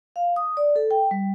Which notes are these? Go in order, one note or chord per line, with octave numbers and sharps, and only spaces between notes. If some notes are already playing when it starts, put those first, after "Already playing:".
F5
D#6
D5
A4
G5
G3